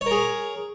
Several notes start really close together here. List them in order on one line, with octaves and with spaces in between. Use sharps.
C#5 A#4 G#4